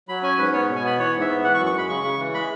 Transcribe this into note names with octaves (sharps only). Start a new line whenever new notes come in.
F#3 B5
C#4 G#5
G#2 B4
B3 C#5
B2
G#5
B3 B5
E3 C#5
G#2
E5
B3
E3 F#5
C#6
F#2
C#6
G#3 B5
C#3 C#6
C#3
E3
G#3 B5